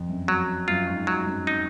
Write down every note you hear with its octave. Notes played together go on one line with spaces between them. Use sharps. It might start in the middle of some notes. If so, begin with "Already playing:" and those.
Already playing: F2
F#2
F#2 F#3
F#2 F4
G#2
G#2 F#3
F#2
D#4